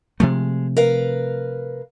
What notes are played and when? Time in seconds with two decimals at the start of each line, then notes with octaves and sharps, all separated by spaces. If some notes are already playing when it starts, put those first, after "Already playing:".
0.20 C3 F3 G#3 A3
0.77 A#4 B4 F5